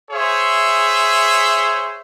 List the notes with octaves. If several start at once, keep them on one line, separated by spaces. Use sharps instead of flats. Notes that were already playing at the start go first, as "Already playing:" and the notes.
G#4 C5 C#5 E5